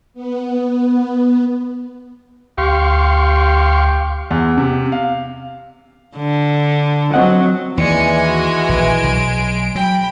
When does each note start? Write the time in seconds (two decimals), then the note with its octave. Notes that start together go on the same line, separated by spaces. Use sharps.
0.14 B3
2.58 D2 G4 F5 C6 C#6
4.31 E2
4.57 C3
4.92 F5
6.17 D3
7.14 F#3 C4 D#5 F#5
7.78 D#2 E3 G#3 D5 G#5 C#7
8.25 F#4
8.69 A#1 D#3 D7
9.04 B1 F#3
9.75 F#3 G5 B5